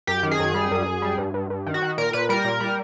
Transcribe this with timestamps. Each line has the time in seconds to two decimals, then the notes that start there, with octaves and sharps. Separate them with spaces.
0.07 F#2 G4
0.23 D#3
0.31 G#4
0.39 F#2
0.55 G3
0.71 F#2
0.86 F#2
1.02 G3
1.18 G2
1.34 G2
1.50 G2
1.66 D#3
1.74 F#4
1.82 D#3
1.98 A#2 A#4
2.13 A#2 B4
2.29 G3 A#4
2.45 A#2
2.60 G3